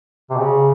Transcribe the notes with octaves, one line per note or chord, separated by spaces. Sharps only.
C3
C#3